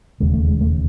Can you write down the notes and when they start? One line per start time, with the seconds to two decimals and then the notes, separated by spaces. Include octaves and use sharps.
0.20 E1 D#2 C#3 G#3
0.34 A3
0.48 G#3
0.61 A3